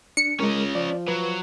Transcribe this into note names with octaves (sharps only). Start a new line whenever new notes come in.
D4 C#7
C#2 G#3 C#4 A#4 D#5
F3 D5
F#3 B4